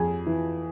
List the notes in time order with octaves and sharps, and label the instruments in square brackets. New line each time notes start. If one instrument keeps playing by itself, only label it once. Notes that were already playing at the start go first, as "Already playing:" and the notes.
Already playing: [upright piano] F2 G#4
E3